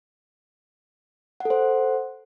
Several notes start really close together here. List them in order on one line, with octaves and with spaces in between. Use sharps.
F#5 A4 C5